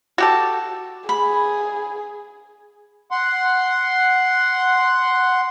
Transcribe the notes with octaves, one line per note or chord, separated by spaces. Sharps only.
F#4 G4 A4
G#4 B5
F#5 C6